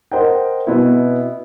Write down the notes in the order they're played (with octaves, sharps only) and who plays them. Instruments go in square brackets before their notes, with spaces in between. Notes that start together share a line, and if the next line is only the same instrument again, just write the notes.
[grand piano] A#4 C5 D#5 F#5 G5
B2 B3 C4 E4